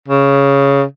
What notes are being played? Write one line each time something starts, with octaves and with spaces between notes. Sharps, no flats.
C#3